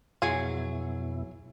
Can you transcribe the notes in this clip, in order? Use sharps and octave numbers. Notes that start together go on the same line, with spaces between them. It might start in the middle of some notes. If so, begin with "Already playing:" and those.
F2 B2 F#3 E4 G#4 G#5